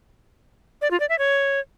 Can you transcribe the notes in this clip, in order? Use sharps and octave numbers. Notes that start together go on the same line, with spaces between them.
D5
F4
D5
E5
C#5